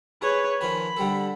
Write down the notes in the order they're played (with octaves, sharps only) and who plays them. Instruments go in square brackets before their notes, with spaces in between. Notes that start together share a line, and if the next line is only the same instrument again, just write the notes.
[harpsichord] G#4 [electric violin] B4 C#5
[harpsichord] D#3 F3 G#5 [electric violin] B5
[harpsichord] D3 G3 A4